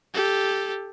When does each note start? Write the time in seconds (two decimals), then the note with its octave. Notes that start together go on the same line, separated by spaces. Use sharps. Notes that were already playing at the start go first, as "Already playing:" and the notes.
0.14 G4 A4